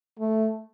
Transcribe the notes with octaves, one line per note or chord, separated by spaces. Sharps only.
A3